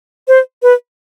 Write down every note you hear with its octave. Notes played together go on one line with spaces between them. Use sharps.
C5
B4